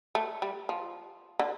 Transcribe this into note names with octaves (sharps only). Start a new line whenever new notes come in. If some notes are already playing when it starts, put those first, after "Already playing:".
A3
G3
F3
D3